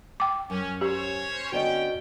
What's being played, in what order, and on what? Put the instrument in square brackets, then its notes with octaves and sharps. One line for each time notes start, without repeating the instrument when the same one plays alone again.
[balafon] G5 D6
[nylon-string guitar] F#2 [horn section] C#4
[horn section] C#4 C5 C#5 [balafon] G4
[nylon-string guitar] D3 B3 [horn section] C#4 G5 [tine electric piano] F#4 D5 D#5